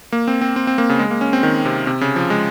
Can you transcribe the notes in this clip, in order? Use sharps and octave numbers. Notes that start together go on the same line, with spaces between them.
A#3
C4
C4
C4
C4
A#3
C#3
G#3
A#3
C#4
C4
D#3
C3
C3
C#3
F3
G#3